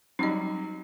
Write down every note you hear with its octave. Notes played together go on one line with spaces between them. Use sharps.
F#3 G3 D#4 D#5